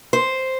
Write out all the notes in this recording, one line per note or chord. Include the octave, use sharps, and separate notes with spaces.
C5